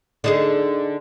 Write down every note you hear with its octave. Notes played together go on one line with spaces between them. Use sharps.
D3 D#4 G#4